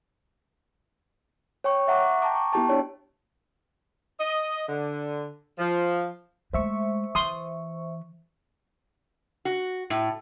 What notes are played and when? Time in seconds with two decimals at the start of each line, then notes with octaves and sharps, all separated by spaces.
1.64 C#5 G5 C#6
1.88 E5 F#5 A#5 C#6 D6
2.22 G5 A5 A#5 D6
2.35 C#6
2.53 B3 E4 G4 G5 A5
2.69 D4 E4 C#5 D5
4.20 D#5
4.68 D3
5.59 F3
6.53 G#3 A3 C5 E5 C#6
7.15 E3 C6 D#6
9.45 F#4
9.90 A2